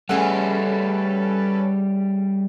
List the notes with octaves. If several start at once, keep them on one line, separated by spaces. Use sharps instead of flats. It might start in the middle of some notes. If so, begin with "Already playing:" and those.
C#3 G3 A3 C#4 G#4 A4 B4 F#5